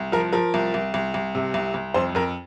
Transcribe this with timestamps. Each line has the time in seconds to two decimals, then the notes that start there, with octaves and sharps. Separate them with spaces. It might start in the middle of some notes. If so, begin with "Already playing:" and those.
Already playing: C2
0.12 F3 A#4
0.33 F3 A#4
0.54 C2
0.74 C2
0.94 C2
1.14 C2
1.35 C3
1.54 C2
1.74 C2
1.94 F2 C5
2.15 F2 A#4